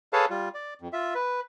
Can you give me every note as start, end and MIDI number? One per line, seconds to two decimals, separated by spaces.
0.13 0.25 68
0.13 0.25 69
0.13 0.25 71
0.13 0.25 73
0.13 0.25 77
0.13 0.25 81
0.30 0.49 55
0.30 0.49 65
0.54 0.74 74
0.81 0.88 41
0.93 1.14 65
0.93 1.14 76
1.15 1.40 71